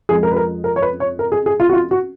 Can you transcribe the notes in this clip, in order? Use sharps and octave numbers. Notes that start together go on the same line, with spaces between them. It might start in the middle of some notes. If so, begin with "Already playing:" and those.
F2 F3 G#3 G#4
A#4
B4
A#4
A#4
C#5
B4
C#5
A#4
G#4
G#4
F4
F#4
F4
F#4